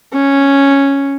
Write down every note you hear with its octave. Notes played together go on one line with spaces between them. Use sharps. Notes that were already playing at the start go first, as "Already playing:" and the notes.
C#4